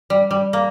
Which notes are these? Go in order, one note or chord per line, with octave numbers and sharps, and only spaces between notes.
G3
G3
A#3